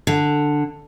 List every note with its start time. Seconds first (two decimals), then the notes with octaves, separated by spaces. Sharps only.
0.07 D3